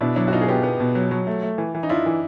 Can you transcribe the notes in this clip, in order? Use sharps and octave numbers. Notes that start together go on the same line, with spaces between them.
B2 D4 E4
F#3 D4 E4
F#4
B2 D#4 F4
G#4
B3 F4 G4
B3
B2
F#3
F#3
A3
A3
E3
E3
D#4
D4 E4 F4
E3